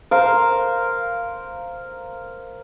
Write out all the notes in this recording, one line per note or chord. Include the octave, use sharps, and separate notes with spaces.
A#4 C5 F5